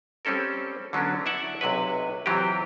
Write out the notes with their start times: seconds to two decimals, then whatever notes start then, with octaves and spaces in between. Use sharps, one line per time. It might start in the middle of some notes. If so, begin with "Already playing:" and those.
0.25 G3 C4 C#4 A4 A#4
0.93 D3 F#3 B3 C#4 D4
1.26 E4 D5 E5 F#5
1.61 B1 C3 F#3 B4
2.26 C3 E3 F#3 C4 F4 G4